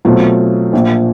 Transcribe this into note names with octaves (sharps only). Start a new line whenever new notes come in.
B2 F#3 A3 C4 F4
A#1 A#2 F3